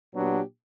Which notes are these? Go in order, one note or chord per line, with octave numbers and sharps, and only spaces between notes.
A#2 F#3 B3 D4 G4